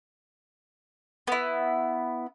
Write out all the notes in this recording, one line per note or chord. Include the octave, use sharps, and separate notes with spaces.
B3 E4